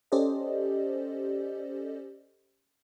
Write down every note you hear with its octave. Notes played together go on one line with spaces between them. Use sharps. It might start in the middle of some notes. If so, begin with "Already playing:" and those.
C#4 G4 A4 C5 D5 D#5